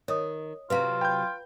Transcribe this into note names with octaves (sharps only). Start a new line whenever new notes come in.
D#3 C#5 D#5 D#6
C3 F#3 C4 F4 B4 F5 A#5
G5 B5 G6